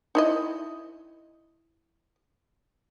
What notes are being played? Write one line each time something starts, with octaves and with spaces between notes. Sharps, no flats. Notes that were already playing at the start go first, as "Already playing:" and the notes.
D#4 E4 D#5